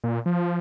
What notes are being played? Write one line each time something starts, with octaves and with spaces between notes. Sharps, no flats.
A#2
F3